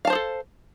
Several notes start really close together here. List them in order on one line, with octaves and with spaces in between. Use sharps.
F5 A5 C5 G#4 A4